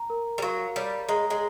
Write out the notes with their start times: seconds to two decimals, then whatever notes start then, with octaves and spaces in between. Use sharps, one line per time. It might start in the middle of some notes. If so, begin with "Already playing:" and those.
Already playing: A#5
0.10 A#4
0.38 G3
0.42 F#3 F5
0.76 G3 C#5
1.09 G#3 A#5
1.30 G#3